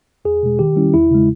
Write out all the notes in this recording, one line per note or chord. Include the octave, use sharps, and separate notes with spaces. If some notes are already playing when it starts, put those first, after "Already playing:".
E2 G#4
B2 G#3
D#3 G4
G3 C#4 E4
E2 E4
C#3 G#3